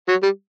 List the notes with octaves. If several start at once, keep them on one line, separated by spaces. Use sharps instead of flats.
F#3
G3